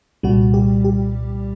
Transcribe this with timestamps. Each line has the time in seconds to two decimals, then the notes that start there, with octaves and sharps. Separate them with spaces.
0.23 C2 A#2 G3 F#4
0.54 G4
0.84 G4